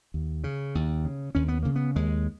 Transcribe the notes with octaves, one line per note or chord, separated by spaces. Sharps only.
D#2
C#3
D#2
C#3
D#2 C#4
B3
C#3 A#3
B3
D#2 G#3